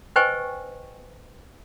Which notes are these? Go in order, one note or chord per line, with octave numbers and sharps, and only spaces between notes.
B4 C5 D#5 G5 G#5 C#6